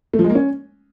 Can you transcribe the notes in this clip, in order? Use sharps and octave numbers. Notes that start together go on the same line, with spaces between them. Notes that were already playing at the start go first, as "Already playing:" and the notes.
A3
F3
G#3
A#3
C#4